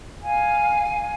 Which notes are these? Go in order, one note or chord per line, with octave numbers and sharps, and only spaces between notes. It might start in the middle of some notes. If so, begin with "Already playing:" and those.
F5 G#5